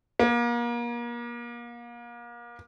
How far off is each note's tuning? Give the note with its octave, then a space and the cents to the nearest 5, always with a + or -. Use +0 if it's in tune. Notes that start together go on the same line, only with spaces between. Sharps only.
A#3 +35